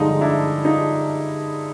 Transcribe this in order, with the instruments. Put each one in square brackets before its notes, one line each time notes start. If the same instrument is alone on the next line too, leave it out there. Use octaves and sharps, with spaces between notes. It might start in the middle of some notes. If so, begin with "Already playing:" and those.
Already playing: [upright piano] G2 D3 F3 G#3 D#4 F4
D4 E4
D#4 F4